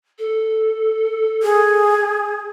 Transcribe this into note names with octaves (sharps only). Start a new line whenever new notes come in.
A4
G#4